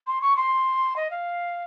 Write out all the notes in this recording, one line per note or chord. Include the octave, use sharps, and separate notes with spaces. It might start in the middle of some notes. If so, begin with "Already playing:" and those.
C6
C#6
C6
D#5
F5